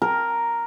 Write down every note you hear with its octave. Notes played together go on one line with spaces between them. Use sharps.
A#4